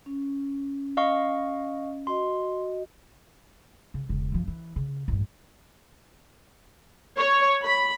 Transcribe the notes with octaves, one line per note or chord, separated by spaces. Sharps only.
C#4
D#5 F5 C#6
F#4 D#5 C6
C#3
E1 C#3
F#2 F3
E3
C#3
A1 G2
C#5
B5